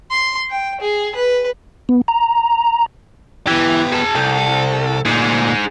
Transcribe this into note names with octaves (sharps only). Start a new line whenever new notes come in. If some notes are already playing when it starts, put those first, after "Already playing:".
C6
G5
G#4
B4
B3
A#5
E3 B3 G4
G#4 A5
C2 A4
D2 A#2 D#4 G#4